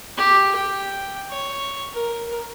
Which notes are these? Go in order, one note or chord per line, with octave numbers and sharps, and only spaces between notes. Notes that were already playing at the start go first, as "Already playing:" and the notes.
G4
G5
C#5
A#4